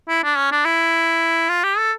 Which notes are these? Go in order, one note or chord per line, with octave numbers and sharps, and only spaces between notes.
E4
D4
C#4
D4
E4
F4
G4
A4